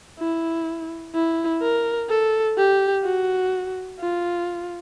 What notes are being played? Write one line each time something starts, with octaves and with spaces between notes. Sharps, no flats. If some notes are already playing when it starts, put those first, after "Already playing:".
E4
E4
A#4
A4
G4
F#4
F4